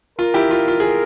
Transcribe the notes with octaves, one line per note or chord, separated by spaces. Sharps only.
F4 A#4
E4 G4
F4
F4
G#4